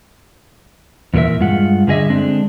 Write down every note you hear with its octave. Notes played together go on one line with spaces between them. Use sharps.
E2 A#2 A3 A#4 E5
G2 G#3 F4 F#5
G2 D3 G#4 D#5 E5
D3 G#3 C4 D4